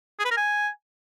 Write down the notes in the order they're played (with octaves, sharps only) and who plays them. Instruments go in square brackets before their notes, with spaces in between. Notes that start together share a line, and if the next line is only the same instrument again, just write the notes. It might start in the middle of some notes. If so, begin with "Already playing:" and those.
[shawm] G#4
B4
A#4
G#5